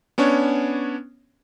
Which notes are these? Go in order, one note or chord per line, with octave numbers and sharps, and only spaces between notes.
B3 C#4 D4 C#5